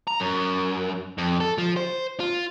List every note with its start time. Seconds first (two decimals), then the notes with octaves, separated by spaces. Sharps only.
0.07 A#5
0.20 F#2
1.18 F2
1.40 A4
1.58 F3
1.77 C5
2.20 F4